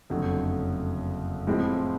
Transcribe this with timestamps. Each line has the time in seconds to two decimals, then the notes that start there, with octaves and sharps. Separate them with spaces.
0.10 F#1 F2 D3 F#3 A3
1.47 A2 F3 G#3 C4 E4